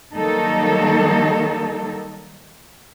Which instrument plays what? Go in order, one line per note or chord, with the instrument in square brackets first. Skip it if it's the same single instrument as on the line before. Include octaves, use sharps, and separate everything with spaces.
[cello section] D#3 F#3 G3 A#3 D#4 A4